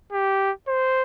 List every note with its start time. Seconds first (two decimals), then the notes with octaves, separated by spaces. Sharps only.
0.13 G4
0.68 C5